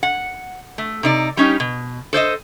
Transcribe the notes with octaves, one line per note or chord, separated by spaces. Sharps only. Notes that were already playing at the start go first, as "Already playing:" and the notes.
F#5
A3
C3 D#4 D5
G3 C#4 D#4 G4
B2
A4 C5 D5 D#5